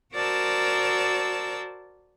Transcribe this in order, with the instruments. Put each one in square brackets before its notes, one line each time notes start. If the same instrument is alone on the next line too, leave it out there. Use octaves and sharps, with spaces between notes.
[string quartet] F#4 A#4 C5 D5 A5 E6